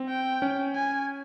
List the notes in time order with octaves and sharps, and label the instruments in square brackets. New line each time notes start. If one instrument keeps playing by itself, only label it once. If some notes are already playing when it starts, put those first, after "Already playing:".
Already playing: [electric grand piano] C4
[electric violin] G5
[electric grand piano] C#4
[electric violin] G#5